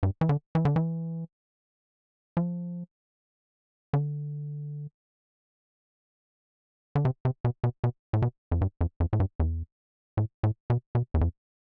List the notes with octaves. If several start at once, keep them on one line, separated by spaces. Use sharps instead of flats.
G2
E3
D3
E3
D3
E3
F3
D3
D3
C3
C3
B2
B2
B2
A2
B2
F2
G2
F2
F2
A2
G2
E2
A2
A2
B2
B2
E2
F2